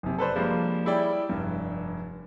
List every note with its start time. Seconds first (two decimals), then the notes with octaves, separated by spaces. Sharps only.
0.03 F#1 C3
0.18 A4 B4 C5 D5
0.36 F3 G3 G#3 A#3 D4
0.86 G3 E4 G#4 C#5 D5 G5
1.29 F1 G2